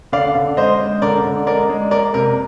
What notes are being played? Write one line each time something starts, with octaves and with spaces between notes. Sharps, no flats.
D3 D5 F5
D3
G#3 C5 D#5
G#3
D3 A#4 D5
D3
G#3 A#4 D5
G#3
A#3 A#4 D5
C3 A#4